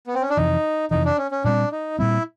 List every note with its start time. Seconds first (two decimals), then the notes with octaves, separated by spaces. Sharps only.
0.07 B3
0.15 C4
0.22 C#4
0.29 D4
0.37 F2 C3 E3 D#4
0.91 F2 C3 E3 D#4
1.05 D4
1.18 C#4
1.31 C#4
1.44 A#2 G3 C4 D4
1.72 D#4
1.99 A#2 G3 C4 E4